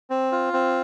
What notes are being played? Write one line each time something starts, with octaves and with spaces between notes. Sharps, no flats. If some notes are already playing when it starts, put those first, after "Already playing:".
C4
F4
C4